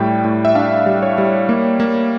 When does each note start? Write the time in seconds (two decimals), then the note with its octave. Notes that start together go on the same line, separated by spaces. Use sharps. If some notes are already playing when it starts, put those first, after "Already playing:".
Already playing: A2 G3 G5
0.25 A2
0.45 E5
0.55 D4 F5
0.86 G3
1.02 C#5
1.18 G3
1.49 A#3
1.80 A#3